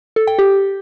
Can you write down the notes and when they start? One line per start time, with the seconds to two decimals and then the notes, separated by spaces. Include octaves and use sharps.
0.16 A4
0.27 G5
0.39 G4